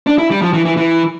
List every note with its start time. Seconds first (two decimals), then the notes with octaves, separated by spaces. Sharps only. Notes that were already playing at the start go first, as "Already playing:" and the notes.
0.07 D4
0.18 E4
0.30 G3
0.42 F3
0.53 E3
0.65 E3
0.77 E3